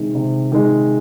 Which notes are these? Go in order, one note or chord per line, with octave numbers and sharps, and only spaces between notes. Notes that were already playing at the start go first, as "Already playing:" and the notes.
Already playing: C3 D#3 G#3
C3
D#3 G#3